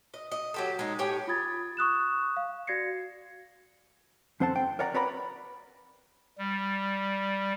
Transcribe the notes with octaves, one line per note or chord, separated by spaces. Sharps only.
D#5
D#5
F#3 G4 A4
G#3 D#4
A2 G4 C#5 G#5
F4 B5 D#6 G#6 A6
C#6 D#6 F#6 E7
F5
F#4 D5 G#6 A#6 C7 C#7
F2 C4 C5 F#5 A5
G5
A#4 C#5 D5 F#5 A#5
C4 B4 C#5 D5 A#5 B5
G3